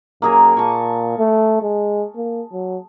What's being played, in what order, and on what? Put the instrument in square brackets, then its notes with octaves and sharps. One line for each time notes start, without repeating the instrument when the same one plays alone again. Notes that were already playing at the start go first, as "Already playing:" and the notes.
[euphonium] F#2 [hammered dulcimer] A#3 G#4 A#4
[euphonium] A#2 [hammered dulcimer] A5 C#6
[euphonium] A3
G#3
A#3
F#3